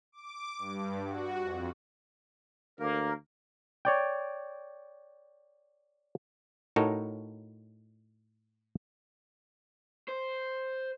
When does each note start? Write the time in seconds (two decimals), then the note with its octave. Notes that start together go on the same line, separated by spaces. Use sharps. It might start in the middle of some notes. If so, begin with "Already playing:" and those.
0.12 D6
0.58 G2
1.05 F#4
1.40 F2
2.79 D2 A#3 A#4
3.85 C#5 D5 G5
6.76 A2 D#4 F#4 A4 A#4 C#5
10.08 C5